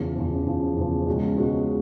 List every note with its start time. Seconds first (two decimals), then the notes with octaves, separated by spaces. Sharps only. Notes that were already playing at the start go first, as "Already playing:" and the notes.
Already playing: E2 C#3 F3
0.16 E2 C#3 F3
0.46 E2 C#3 F3
0.77 E2 C#3 F3
1.07 C#2 B2 G#3 C#4 F#4
1.37 C#2 B2 G#3 C#4 F#4